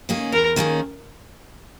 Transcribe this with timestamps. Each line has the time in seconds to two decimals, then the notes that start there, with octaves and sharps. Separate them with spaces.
0.09 D#3 A#3 C#4 G#4
0.32 E2 A#4
0.56 D#3 A#3 C#4 G#4